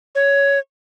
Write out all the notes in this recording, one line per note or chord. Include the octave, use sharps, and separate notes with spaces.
C#5